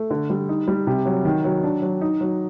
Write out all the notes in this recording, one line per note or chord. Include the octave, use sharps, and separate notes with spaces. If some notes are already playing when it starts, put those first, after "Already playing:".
Already playing: A3
D3
G3
D#4
G3
C3
F#3
D#3
F#3
D4
F#3
D#4
F#3